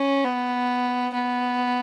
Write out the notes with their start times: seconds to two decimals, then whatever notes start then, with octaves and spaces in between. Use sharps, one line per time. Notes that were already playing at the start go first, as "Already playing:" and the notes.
Already playing: C#4
0.25 B3
1.14 B3